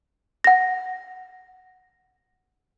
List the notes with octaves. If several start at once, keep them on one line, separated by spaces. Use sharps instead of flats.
F#5 A#6